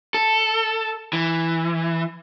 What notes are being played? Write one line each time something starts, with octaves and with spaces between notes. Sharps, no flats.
A4
E3